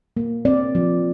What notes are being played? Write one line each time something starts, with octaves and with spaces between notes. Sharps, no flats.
A#3
C4 D5
F3